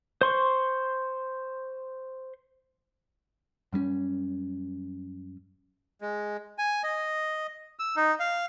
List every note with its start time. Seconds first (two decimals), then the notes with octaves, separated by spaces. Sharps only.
0.21 C5 C6 C#6
3.73 F#2 G3 G#3 C#4
6.01 G#3
6.58 G#5
6.84 D#5
7.79 E6
7.96 D#4
8.20 F5